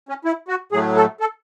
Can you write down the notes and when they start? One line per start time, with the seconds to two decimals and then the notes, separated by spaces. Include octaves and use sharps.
0.09 C#4
0.25 E4
0.48 F#4
0.72 A2 F#3 A3 G#4
0.96 A4
1.20 A4